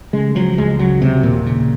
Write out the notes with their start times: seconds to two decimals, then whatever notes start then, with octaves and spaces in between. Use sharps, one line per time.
0.13 C#3 G#3
0.35 F3 F#3
0.58 C#2 G#3
0.79 C#3 F#3
1.01 C3 F#3
1.23 D#2 A#2
1.46 C#3